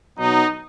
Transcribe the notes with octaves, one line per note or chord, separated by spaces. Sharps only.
B2 F#3 B3 D#4